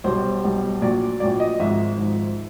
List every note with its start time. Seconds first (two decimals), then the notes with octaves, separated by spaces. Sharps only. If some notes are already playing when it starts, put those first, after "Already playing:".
0.04 B1 B2 G3 C5
0.43 B1 B2 G3
0.82 A#1 A#2 F#3 D5
1.20 A#1 A#2 F#3 D5
1.40 D#5
1.59 G#1 G#2 F3 E5
1.97 G#1 G#2 F3